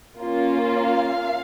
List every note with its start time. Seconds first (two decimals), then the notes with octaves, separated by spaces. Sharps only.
0.21 A#3 C#4 F4
0.75 F5